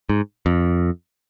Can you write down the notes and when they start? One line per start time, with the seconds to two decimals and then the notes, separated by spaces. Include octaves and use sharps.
0.09 G#2
0.46 F2